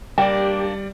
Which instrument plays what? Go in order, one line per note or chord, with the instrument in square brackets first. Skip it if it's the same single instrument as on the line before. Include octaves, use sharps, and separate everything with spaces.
[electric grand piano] G3 D5 [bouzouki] A#3 D4 [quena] G4 [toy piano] G5